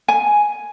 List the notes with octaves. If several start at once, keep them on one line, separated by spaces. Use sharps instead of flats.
G#5